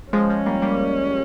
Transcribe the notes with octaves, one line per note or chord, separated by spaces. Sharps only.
F3 G#3 C#4
F3 G#3
G3 A#3
G3 A#3